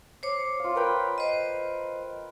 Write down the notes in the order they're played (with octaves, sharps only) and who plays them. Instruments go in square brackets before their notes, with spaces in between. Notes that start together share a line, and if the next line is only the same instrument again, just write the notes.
[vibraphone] C5 C#5 D6
[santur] F4 F5
A#4 B4 G5
[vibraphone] C5 D#5